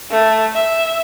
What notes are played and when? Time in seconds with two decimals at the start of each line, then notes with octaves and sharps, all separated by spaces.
0.10 A3
0.53 E5